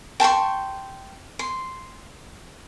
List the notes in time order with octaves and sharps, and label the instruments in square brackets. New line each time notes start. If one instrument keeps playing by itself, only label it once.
[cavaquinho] G5 A5 C6 C#6
C6